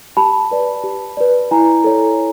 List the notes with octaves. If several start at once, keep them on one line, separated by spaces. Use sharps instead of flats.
G4 A5 B5
B4 D5
G4
B4 D5
E4 G#5 A#5
A4 C#5